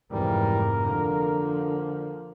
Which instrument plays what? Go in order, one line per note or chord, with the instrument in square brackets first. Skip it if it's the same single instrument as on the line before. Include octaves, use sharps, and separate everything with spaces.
[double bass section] F1 F2 G#2 [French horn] E3 [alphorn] G3 [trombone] A#4
[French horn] D3 [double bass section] F3 [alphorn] A#3